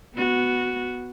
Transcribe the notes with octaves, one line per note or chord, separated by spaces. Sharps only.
B3 F#4